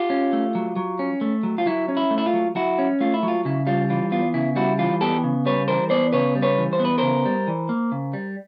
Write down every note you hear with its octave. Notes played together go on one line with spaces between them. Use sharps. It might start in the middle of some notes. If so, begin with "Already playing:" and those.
Already playing: F4 G4
C#4
A3
F#3
F#3
C#4
A3
F#3
F4
F#3 E4
C#4
E4
A3
E4
F4
F#3
F#3 E4 F#4
C#4
A3 F4
E4
F#3
F4
C#3 E4
G3 F4
E3 F4
B3 F4
C#3 E4
G3 E4 F#4
E3 F4
B3 G4 A4
C#3
G3 B4 C#5
E3 A#4 C5
B3 C5 D5
C#3 B4 C#5
G3
B4 C#5
E3
C5
B3
B4
C#3 A#4 C5
G3
E3
A#3
C#3
G3